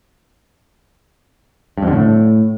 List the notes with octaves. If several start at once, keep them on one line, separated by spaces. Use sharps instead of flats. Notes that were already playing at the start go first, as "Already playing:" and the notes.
G2
F2
D3
A2